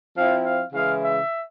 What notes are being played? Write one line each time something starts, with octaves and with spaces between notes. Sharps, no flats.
F3 C4 E4 F5
F5
C#3 E3 G#3 E4 F5
E5